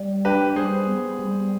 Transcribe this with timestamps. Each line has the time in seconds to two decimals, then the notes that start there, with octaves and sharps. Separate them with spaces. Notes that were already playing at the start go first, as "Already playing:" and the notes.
Already playing: G3
0.25 D4 G4 B4
0.56 G3 G#4 C5
0.87 B3
1.19 G3